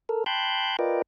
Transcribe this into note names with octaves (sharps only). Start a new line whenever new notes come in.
A4 A#4
G5 A5 B5 C6 F#6 G6
F4 A#4 B4 D5 D#5 G5